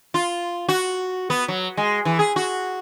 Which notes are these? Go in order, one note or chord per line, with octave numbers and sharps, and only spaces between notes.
F4
F#4
B3
F#3
G#3
E3
G#4
F#4